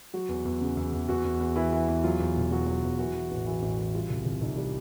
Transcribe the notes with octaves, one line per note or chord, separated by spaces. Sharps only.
F#3 F#4
E2
E2
C#3
E2
E2
E2 F#4
E2
E2
E3 E4
E3
E2
F#3 F4
E2
E1
F#3 F#4
F#3
E2
E3 F#4
E3
A1
E3 F#4
A1
E3
G3 F4
C2
C2
C2 D#4
G3